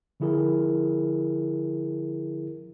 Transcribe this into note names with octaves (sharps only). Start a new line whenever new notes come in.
D3 F3 E4 G#4 A#4